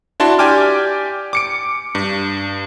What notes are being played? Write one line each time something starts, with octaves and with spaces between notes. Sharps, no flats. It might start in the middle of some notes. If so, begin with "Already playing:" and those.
D4 E4 F#4 A5 C6
G4 D5 G5 G#5 D6 F6
D6 C#7 D7
G2